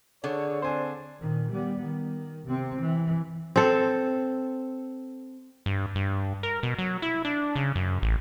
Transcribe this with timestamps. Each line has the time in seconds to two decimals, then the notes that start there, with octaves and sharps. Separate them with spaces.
0.24 D3 G#4 C#5
0.62 C4 D4 C5 G#5
1.20 A#2 D#3
1.52 G3 B3
1.83 D#3
2.47 C3 C4
2.81 E3
3.56 C4 A4
5.66 G2
5.95 G2
6.43 A#4
6.63 B2
6.79 F#3
7.02 E4
7.25 D4
7.56 C#3
7.75 F#2
8.02 A1